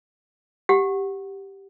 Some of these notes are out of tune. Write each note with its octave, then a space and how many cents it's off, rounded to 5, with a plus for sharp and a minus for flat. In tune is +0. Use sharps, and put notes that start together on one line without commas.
G4 +0 F#5 +0